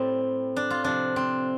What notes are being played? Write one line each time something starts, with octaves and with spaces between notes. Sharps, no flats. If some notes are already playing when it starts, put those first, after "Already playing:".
Already playing: A2 G3 C4
D4
F4
C3 F3 D4
C4